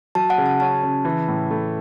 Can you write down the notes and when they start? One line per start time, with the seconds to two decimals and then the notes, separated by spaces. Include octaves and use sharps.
0.15 F#3 A5
0.30 F#5
0.38 C#3
0.46 A5
0.60 C#4 A5
0.83 C#3
1.05 E3
1.28 A2
1.51 A3